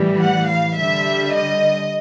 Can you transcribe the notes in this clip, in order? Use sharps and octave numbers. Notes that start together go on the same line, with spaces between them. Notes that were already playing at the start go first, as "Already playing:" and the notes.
Already playing: A2 E3 G3
F#5
F5
D3 G3 E5
D#5